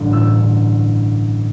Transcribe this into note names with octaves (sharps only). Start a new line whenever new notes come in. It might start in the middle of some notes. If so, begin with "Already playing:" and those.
Already playing: A1 G2 D3
A1 E6
G2 D3